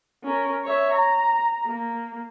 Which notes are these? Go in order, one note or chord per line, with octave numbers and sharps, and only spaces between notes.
C#4 A#4
C#5 E5
A#5
A#3